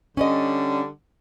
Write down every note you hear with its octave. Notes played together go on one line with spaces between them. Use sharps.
D3 G3 C#4 D5 D#5